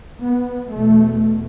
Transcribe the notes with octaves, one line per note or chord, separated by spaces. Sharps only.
B3
E2 B2 A3